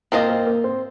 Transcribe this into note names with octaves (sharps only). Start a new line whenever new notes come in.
A#3 C4 F4 C5 D#5
A#3
A#3
C4